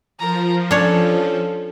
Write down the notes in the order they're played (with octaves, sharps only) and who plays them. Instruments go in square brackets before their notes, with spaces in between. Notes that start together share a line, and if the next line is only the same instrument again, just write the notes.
[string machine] F3 [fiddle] A#4 A#5
[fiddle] C#4 A4 [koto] D4 C#5